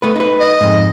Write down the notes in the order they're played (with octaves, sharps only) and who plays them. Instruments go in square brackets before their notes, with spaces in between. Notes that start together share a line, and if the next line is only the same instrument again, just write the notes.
[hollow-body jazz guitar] A3 B3 B4
D#4 B4
[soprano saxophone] D#5
[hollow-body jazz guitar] F2 G#2